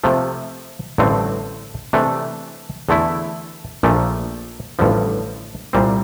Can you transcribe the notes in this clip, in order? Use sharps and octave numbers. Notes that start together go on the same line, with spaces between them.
C3 F3 A3
A1 G2 D3 A3 C4
C3 E3 A3 D4
E2 D3 A3 E4
A#1 A#2 F3 A3
A1 G2 D3 F3
C2 A#2 G3 C4